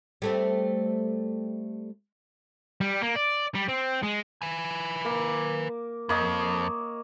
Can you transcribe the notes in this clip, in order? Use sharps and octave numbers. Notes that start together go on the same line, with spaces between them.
G3 A3 C4
G3
A#3
D5
G3
C4
G#3
B4 G#5
A#3
F2 A#3 C#5 D#5